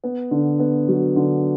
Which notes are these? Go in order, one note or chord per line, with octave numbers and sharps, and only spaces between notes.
B3
D3
B3
F#3
D3